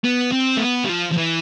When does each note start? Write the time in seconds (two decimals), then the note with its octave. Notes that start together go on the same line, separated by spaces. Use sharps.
0.04 B3
0.32 C4
0.57 A3
0.60 B3
0.84 G3
0.89 F3
1.11 F3
1.17 E3